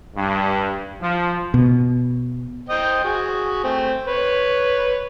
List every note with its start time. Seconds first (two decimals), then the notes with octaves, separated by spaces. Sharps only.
0.16 G2
1.01 F3
1.54 B2
2.69 C5 D#5 G5
3.04 F#4 G#4
3.64 A3 C4
4.08 B4 C#5